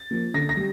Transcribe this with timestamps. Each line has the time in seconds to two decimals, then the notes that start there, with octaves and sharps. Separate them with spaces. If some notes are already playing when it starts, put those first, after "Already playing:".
Already playing: A6
0.11 F3 A#3
0.34 D3 A#6
0.49 A#6
0.57 G3